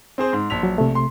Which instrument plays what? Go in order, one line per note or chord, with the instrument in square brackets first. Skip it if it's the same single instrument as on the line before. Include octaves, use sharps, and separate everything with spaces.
[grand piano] C4 G#4 C5
[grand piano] G#2 [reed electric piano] C6
[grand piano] A#1 B6 F7
[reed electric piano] F#3
C3 A3
[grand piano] C6